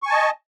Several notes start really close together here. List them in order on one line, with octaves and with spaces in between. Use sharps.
C#6 G#5 A5 D#5